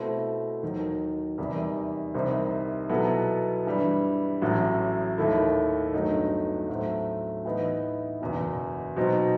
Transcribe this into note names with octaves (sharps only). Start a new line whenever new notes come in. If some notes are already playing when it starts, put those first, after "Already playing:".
Already playing: B2 A3 C4 E4 A4
D#2 D#3 F#3
E2 C3 D#3 G3
C2 C3 D#3 G3 C4
B2 F#3 B3 E4 A4
G2 E3 G3
A1 A2 F#3
D#2 D#3 A3 E4 A4
G1 G2 F#3 A3 D#4
A2 F#3 A3 C4
A2 E3 B3 D#4
F#1 E2 B2
B2 F#3 C4 D#4